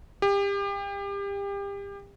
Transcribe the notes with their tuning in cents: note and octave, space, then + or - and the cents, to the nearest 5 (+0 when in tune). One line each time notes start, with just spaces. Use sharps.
G4 +30